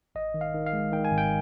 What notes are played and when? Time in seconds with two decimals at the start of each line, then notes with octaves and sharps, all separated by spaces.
0.15 G#1 D#5
0.34 D#3
0.41 F5
0.54 D#3
0.66 F5
0.73 G#3
0.92 D#3 G5
1.05 G#5
1.12 G#1
1.18 G5